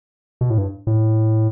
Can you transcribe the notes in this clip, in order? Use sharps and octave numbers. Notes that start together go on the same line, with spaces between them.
B2
A2
G2
A2